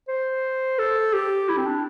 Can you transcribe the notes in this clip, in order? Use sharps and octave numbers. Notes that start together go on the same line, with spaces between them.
C5
A4
G4
E4
C4
D4